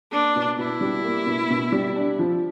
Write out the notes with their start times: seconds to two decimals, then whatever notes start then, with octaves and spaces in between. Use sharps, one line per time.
0.12 A#3 D4
0.36 B2
0.58 B2 E4
0.81 G3
1.04 A#3
1.27 B2
1.50 B2
1.72 G3
1.96 D4
2.19 F3